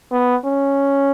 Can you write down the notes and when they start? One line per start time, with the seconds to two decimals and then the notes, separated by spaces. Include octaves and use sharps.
0.12 B3
0.45 C#4